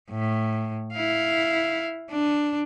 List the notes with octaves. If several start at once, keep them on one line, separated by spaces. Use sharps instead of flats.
A2
E4 F5
D4